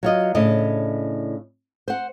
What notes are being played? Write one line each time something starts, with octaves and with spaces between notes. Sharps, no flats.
F#3 F4 D#5
A2 C#3 D4 D#5
C5 F#5